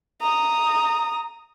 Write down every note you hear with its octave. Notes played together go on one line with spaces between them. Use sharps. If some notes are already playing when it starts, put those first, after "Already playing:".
A#5 D#6